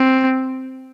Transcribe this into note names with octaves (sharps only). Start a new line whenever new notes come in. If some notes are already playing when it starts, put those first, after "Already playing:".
Already playing: C4